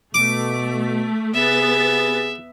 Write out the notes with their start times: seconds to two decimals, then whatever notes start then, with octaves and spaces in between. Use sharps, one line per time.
0.14 B2 A3 D6
1.34 C3 B3 G#4 E5 A6